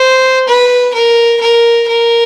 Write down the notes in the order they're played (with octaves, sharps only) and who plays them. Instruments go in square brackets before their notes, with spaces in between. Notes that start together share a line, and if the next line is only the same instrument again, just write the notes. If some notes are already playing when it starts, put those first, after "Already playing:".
Already playing: [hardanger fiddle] C5
B4
A#4
A#4
A#4